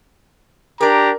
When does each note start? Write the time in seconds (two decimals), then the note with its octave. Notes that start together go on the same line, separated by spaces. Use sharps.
0.81 D4 G4 A#4 D5 A#5